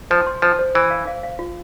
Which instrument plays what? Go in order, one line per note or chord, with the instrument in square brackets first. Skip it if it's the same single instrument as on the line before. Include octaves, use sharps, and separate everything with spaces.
[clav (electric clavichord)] F3 [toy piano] C5
[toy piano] C6
[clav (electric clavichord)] F3 [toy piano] C5
[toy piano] C5
[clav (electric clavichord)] E3 [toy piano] C5
[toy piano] F5
F5
F5
F4